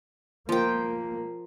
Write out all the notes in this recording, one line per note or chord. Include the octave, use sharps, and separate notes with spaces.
F3 A#3 G5